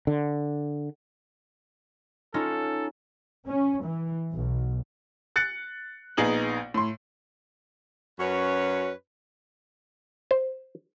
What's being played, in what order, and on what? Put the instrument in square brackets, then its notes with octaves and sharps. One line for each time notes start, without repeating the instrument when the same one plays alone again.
[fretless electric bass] D3
[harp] C#4 D#4 F4 [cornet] A4
[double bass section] C#4
E3
B1
[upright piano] F#6 A6 C#7
A#1 B3 D#4 G#4 F#7
A2 C6
[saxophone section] F#2 C#4 F#4 B4 C#5
[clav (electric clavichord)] C5